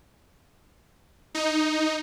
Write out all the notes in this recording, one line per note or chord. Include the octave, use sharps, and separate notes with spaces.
D#4